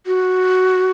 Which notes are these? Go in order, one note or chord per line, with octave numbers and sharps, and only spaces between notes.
F#4